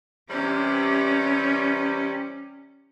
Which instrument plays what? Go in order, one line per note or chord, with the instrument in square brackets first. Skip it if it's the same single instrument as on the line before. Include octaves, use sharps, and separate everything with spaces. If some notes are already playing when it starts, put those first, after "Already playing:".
[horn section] C3 E3 G3 [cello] C#4